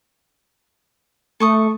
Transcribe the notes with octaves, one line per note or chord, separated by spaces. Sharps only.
A3 A4 C#6 D#6